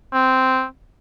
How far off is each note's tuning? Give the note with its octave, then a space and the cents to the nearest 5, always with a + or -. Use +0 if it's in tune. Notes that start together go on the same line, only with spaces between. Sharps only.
C4 -10